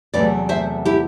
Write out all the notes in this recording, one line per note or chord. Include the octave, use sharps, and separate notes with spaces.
E2 C3 F#3 A3 B4 D5
C5 E5
E4 G4